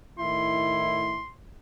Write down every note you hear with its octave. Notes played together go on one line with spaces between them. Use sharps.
A2 D#3 E4 C6